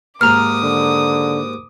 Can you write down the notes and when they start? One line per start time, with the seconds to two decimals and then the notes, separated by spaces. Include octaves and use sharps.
0.21 D#2 G#2 A#5 D6 D#6 F6
0.64 D3